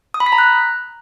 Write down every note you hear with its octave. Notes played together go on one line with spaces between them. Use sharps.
D#6
B5
B6
A#5
F#6